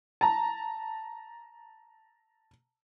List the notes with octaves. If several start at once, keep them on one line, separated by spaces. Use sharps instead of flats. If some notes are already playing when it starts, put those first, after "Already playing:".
A5 A#5